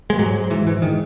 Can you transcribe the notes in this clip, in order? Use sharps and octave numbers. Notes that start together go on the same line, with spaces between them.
G#3
G#2 F#3
G#2 E3
E3
D#3